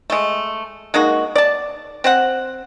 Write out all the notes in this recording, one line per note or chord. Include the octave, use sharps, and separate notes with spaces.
G#3 A3
G#3 A#3 D#4 F#4
D5 A5
C4 C5 F#5